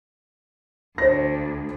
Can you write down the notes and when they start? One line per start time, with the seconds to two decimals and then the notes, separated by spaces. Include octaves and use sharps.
0.98 D2 C5 A#6